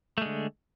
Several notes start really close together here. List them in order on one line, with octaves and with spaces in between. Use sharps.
A3 G#3 D3